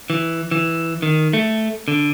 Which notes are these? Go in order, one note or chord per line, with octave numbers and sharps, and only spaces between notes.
E3
E3
D#3
A3
D3